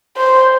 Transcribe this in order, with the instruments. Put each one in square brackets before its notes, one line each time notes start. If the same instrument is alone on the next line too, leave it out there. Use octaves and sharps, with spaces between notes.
[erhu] C5